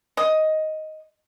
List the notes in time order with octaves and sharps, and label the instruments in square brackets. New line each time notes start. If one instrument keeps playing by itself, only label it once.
[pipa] D#5